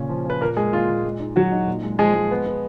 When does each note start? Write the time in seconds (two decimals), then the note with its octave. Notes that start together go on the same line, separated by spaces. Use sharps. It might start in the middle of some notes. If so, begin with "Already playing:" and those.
Already playing: A#2 C#3 C#4
0.09 F3
0.25 C#4 B4
0.41 A#2 A#3 A#4
0.57 G#3 G#4
0.73 A#2 F4
0.89 A#2
1.05 G#3
1.20 D#4
1.36 F#3 D#4 F#4
1.52 D#4
1.67 A#2
1.83 G#3
1.99 F3 G#3 G#4
2.14 G#3
2.31 B3
2.46 B3